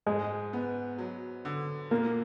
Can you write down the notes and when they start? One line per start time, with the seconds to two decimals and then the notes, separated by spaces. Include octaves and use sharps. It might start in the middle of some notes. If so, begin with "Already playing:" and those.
0.06 G#2 G#3
0.53 B3
0.98 F#3
1.45 D3
1.91 A#2 A#3